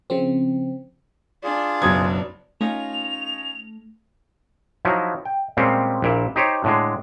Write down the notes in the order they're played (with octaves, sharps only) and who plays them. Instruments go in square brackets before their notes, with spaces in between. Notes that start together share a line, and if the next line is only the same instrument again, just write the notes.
[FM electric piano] C#3 F3 C4
[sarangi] D4 [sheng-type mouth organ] F4 G#4
[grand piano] F#1 B1 G#6 [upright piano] B3 D#6
[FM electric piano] A3 [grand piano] C#4 D#4 F4 [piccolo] F7
[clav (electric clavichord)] F3 F#3 D#4 E4
G5
A#2 G3 G#3 C4 C#4
A#1 A#2 E4
D#4 G4 C5 C#5
A2 D3 G#3